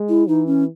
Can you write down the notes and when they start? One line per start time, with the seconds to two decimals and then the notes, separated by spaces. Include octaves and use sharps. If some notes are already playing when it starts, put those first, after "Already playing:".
Already playing: G#3
0.09 E4
0.28 E3 D#4
0.47 C#4